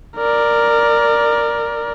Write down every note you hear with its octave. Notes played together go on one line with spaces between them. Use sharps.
A#4 D5